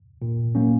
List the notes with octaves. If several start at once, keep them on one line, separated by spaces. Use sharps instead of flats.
A#2
F#3 A#3 C#4